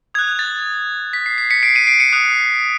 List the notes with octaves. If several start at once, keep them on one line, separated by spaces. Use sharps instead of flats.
D#6 F#6 G#6
A6
B6
C7
C7
B6 C#7
C7 D7
C#7 D#7
C7 D7
C#7 D#7
D#6 F#6 C#7 D#7